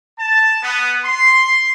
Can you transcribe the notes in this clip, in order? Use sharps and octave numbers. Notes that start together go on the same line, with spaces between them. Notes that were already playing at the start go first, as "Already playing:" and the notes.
A5
B3
C6